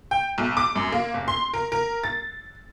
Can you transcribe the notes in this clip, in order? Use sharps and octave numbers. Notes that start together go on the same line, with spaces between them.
G5
B1
D6
F#2
A#3
F#1
C6
A#4
A#4
A6